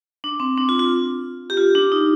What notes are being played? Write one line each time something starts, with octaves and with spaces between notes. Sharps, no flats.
D4
C4
D4
F4
F4
G4
F4
D4
D#4